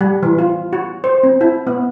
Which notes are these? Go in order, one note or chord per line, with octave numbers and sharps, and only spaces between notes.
G3
E3
F4
F#4
C5
C4
E4
B3